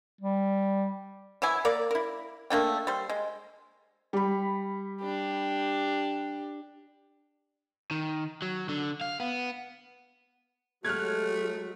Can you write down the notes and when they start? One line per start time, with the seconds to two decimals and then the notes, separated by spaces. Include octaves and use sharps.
0.21 G3
1.42 E3 F#3 E4 G#5
1.65 A#3 A#4 D5
1.91 E4 A#4
2.50 A3 A#3 D4 G5
2.87 G3 C5
3.10 G#3
4.13 G3 B5
5.01 D4 G4
7.91 D#3
8.42 F#3
8.69 D3
9.01 F5
9.20 B3
10.85 F#3 G#3 A3 G4 A4 F6 F#6 G#6